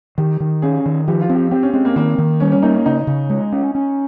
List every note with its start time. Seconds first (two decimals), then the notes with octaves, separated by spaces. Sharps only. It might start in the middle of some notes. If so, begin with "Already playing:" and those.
0.18 D#3 G4
0.40 D#3
0.62 C#4 G#4
0.86 D#3
1.08 F3 G4
1.21 F4
1.29 C4
1.35 G4
1.51 C4 G4
1.63 C#4
1.73 G#3 C4
1.85 A#3
1.96 D#3 A#3
2.18 D#3
2.40 G3 C#4
2.52 C#4
2.62 A#3 D#4
2.74 C#4
2.86 C#3 D#4
3.07 C#3
3.30 G#3
3.52 C#4
3.75 C#4